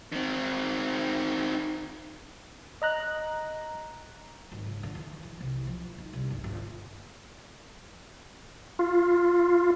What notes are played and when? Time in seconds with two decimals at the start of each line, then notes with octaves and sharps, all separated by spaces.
0.12 D#3 C4
2.82 D#5 A#5 F#6
4.52 G#1
4.66 C#2
4.83 D3
4.95 E2
5.23 E3
5.41 C2
5.67 F3
5.98 D#4
6.13 C2
6.30 G1
6.44 G1
8.79 F4